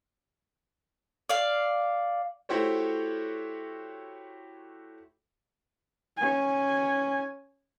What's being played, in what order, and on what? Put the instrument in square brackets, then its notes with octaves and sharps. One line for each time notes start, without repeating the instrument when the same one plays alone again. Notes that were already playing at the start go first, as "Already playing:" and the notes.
[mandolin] D5 F5
[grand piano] A3 E4 F#4 G4 C5 C#5
[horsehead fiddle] C#4 G#5